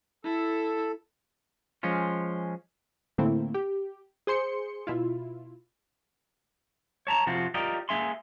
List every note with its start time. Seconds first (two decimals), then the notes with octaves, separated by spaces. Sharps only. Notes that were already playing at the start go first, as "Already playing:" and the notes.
0.25 E4 A4
1.83 F3 G#3 C#4 F4
3.18 A2 D3 A3 A#3 C4 E4
3.54 G4
4.27 G#4 C5 C6 C#7
4.87 B2 E4 F4
7.07 C#5 A5 A#5
7.27 C3 F3 F4 F#4
7.54 F4 G4 A#4 D5 D#5
7.89 A#3 G#4 E5 G#5 C6